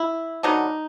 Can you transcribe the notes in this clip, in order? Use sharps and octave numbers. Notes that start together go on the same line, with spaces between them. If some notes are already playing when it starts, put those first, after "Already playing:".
Already playing: E4
D3 F#3 B3 D#4